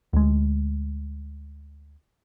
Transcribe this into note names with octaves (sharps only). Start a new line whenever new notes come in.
D2 G#3